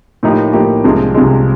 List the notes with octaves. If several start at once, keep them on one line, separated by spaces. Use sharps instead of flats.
A2 F3 A#3 D#4 G4
A2 F3 A#3 D#4 G4
C2 C3 F3 G#3
C2 C3 F3 G#3